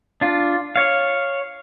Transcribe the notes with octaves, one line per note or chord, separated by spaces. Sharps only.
D4 F4
C#5 F5